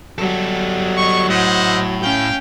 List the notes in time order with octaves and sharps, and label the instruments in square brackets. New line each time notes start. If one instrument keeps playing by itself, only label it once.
[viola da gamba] F#3 [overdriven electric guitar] G3 A4
[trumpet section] D#5 C#6
[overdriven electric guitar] A2 [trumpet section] C5 D#5 F#5
[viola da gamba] C#4 [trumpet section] F5 G5